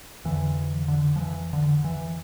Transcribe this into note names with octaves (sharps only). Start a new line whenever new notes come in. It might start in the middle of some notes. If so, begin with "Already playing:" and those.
F2 D3 E3
D3
F3
E3
D3
E3